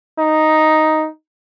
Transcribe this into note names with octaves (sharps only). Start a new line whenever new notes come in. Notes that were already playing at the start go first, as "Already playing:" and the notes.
D#4